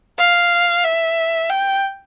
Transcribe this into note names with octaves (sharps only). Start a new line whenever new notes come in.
F5
E5
G5